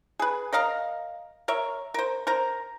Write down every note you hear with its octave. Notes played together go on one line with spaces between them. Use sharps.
G#4 B4
A#4 D#5 F5 A#5
A#4 C#5 E5
A#4 C5
A#4 C5 A#5